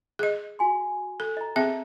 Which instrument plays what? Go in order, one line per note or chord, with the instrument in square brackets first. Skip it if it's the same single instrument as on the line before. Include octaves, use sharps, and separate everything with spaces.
[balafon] G#4 D#5
[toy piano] F#4 G#5 C6
[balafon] A4
[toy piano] D#5 A#5
[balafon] C4 G#4 E5 [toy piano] G5